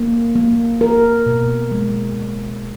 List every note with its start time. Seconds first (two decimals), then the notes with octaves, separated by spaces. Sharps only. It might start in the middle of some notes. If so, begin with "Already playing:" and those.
Already playing: A#3
0.35 A#3
0.81 A#4
1.26 B2
1.72 G#3